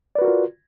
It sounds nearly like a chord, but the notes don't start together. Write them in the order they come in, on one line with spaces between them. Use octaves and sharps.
D5 B4 F#4 A#4 F4